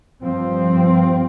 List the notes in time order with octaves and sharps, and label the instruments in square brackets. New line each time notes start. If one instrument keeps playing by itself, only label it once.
[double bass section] G2 F3 C4